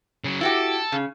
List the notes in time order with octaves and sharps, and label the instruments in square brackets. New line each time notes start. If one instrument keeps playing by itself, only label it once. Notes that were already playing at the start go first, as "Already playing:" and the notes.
[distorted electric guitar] C#3 F#3
[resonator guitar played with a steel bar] E4 F#4 G4 [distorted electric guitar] A4
[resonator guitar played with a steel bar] C#3